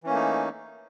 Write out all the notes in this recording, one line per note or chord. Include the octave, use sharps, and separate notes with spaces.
E3 A3 A#3 C#4 D#4